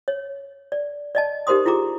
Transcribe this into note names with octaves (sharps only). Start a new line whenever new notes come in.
C#5
D5
D5 D#5 A5
D#4 G4 A#4 C5 C6 D#6
E4 F4 G#4 A#5 D6